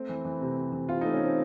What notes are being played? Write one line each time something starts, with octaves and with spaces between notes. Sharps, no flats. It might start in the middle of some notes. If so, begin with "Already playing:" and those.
Already playing: A3 C4
E3
E3
C3
C3
E3
C3 F4
A3 D#4
C#4
A3 C4